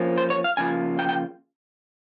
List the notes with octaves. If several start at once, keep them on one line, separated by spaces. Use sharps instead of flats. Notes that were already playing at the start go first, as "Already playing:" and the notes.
Already playing: F3 A#3 C#4
C5
C#5
F5
C#3 F3 A#3 F4 G#5
G5
G5